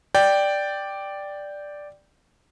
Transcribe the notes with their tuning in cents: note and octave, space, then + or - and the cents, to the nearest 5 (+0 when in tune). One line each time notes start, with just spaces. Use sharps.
D5 +0 G5 +0